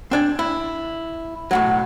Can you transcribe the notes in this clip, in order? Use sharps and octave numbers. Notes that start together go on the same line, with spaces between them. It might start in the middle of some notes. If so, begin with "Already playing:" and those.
C4 D4 G#5
E4
B1 A2 F#3